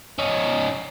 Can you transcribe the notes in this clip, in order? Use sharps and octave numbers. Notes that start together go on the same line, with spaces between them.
C#4 D#4